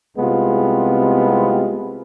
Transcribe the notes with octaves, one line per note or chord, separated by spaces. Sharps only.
C2 C3 G#3 B3 F4